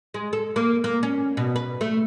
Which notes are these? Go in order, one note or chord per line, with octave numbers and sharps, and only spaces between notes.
G#3
A4
A#3
A#3
C#4
B2
B4
A3